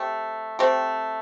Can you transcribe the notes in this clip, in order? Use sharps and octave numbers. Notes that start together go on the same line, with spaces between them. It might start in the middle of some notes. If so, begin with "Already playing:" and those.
Already playing: A3 C4 G4
A3 C4 G4